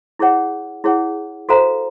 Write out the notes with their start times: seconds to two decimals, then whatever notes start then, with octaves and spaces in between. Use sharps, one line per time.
0.19 E4 G#4 C#5 F#5
0.84 E4 G#4 C#5 F#5
1.49 F#4 A4 C5 F5 A#5